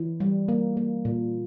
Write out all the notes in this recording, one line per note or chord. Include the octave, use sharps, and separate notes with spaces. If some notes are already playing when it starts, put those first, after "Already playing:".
Already playing: E3
G3
A#3
A#3
A#2